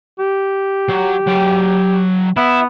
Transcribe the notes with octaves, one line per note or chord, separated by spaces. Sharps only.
G4
F#3
F#3 G5
B3 E4